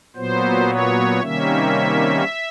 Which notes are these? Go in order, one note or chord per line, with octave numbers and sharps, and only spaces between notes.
A#2 F#3 B3 C5
C#5
C3 D#3 G3 A#3 C#4 E5